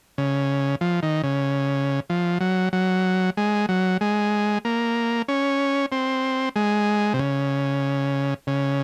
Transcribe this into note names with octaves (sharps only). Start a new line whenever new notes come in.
C#3
F3
D#3
C#3
F3
F#3
F#3
G#3
F#3
G#3
A#3
C#4
C4
G#3
C3
C#3
C#3